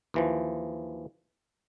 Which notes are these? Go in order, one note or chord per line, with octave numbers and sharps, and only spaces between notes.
D#2 E3 F3